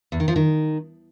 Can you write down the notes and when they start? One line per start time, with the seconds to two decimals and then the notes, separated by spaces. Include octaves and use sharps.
0.12 E2
0.20 D#3
0.28 F3
0.36 D#3